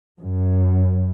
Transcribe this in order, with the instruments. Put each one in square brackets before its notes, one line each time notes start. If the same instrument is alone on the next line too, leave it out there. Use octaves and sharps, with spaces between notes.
[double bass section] F#2